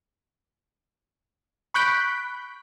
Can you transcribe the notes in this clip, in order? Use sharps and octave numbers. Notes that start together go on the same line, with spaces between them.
B5 C#6 F#6 G6 B6 D7